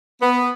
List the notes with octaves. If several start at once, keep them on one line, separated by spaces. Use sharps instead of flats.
B3